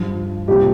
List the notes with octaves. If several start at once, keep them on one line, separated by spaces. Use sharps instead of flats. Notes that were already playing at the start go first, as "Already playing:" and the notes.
Already playing: G2 F3
C2 A#2 F3 G4